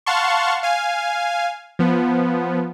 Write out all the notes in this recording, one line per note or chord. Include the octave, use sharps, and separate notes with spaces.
F5 F#5 A5 C6 C#6
F5 G#5
F3 B3